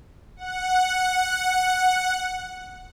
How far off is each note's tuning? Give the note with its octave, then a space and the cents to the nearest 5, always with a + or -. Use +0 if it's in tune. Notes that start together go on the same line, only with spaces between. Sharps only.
F#5 -5